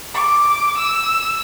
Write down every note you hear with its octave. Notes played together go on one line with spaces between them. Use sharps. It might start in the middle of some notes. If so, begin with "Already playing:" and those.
D6
E6